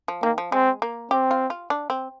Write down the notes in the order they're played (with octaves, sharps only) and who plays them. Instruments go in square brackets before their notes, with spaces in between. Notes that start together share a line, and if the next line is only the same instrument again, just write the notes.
[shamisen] F3
[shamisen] D#3 [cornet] A#3
[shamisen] F3
[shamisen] G#3 [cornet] C4
[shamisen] A#3
[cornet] C4 [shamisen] G4
[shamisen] F4
F4
D4
C4